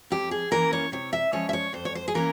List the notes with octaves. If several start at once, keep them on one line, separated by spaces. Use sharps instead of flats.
F2 G4
G#4
E3 A#3 C#4 A#4
C#5
C3 C#5
E5
F3 G#3 C#4 C#5
E5
C#5
F2 C5
C#5
C5
G#4
E3 A#3 C#4 A#4